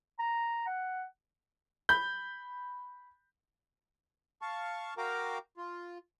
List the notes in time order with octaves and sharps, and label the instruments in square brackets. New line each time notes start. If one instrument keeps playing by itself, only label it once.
[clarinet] A#5
F#5
[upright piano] B5 G6
[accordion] F5 A5 C#6
F#4 A#4 F5 G5 A#5 D6
F4